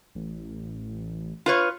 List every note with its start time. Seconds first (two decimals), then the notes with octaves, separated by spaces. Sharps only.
0.15 A1
1.46 F4 B4 C#5